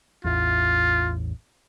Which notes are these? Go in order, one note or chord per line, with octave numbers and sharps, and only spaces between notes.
A1 E2 F4